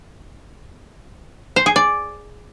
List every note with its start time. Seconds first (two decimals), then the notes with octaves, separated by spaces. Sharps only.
1.56 C5
1.66 G#4
1.76 D5